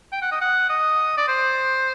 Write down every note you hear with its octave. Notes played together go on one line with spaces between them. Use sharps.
G5
F#5
D#5
F#5
D#5
D5
C5